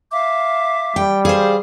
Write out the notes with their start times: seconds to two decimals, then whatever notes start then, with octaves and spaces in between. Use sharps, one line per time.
0.12 E5 F5 D6
0.96 G3 G5
1.25 G#4 C5 F5